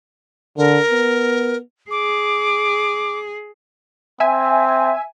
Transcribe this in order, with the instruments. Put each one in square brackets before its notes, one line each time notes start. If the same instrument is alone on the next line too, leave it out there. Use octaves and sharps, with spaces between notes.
[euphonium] D3 [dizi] A#4
[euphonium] B3
[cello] G#4 [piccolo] D6
[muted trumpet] C4 [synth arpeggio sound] E5 G#5